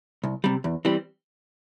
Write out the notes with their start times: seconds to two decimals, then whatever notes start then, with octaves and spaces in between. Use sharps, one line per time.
0.24 C2
0.44 C3 G3
0.64 E2
0.85 E3 G3 C4